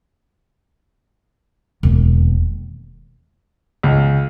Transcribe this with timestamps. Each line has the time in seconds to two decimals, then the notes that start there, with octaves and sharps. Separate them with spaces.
1.83 E1 D#2
3.83 C#2